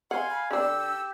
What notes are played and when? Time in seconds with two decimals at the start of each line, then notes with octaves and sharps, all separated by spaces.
0.11 F5 F#5 G#5 C6
0.30 B5
0.51 D3 D4 G4 E6